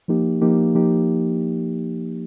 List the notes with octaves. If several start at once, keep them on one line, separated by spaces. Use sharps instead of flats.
F3 A#3 D#4 G4
F3 A#3 D#4 G4
F3 A#3 D#4 G4